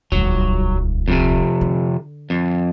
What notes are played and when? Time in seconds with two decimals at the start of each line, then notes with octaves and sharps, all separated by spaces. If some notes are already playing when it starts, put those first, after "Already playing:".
0.12 D#1 C#2 F#3
1.08 F2 A2 C3
1.61 D3
2.30 F2